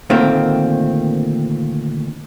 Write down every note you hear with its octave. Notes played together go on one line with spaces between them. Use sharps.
D2 A#2 D#3 A3 A#3 C4